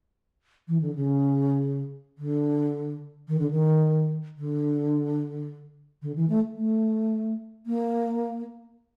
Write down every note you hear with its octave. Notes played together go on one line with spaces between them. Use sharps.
E3
D3
C#3
D3
D#3
D3
D#3
D3
D3
E3
A3
A3
A#3